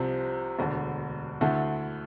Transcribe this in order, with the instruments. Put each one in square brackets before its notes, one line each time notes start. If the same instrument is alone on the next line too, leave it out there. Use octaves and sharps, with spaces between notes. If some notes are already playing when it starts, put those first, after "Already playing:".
Already playing: [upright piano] C2 C3 F3 C4
E1 D2 D3
D2 D3 A3 E4